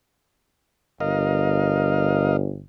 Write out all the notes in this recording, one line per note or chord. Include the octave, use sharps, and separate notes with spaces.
G1 A#4 D#5 F5